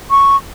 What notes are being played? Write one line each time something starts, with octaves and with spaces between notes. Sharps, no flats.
C#6